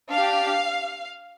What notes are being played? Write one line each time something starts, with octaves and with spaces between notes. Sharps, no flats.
D4 G4 F5